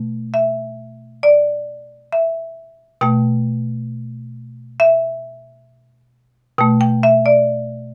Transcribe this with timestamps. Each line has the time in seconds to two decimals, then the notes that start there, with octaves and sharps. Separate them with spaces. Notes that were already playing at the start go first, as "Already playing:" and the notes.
Already playing: B2 A3
0.34 E5
1.23 D5
2.13 E5
3.01 B2 A3 G5
4.80 E5
6.58 B2 A3 G5
6.81 G5
7.03 E5
7.26 D5